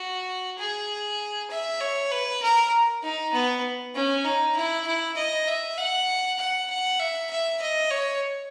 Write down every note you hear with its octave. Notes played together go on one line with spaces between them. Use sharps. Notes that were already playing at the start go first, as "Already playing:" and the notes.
Already playing: F#4
G#4
E5
C#5
B4
A#4
D#4
B3
C#4
D#4
E4
E4
D#5
E5
F#5
F#5
F#5
E5
E5
D#5
C#5